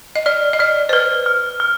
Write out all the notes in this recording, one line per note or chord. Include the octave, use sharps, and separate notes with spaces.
D#5
D5 F6
D#5
D5 F6
C5
B4 F6
F6
F6